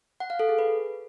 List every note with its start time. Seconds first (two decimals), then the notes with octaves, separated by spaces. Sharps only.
0.20 F#5
0.30 F5
0.39 A4
0.49 G#4
0.59 B4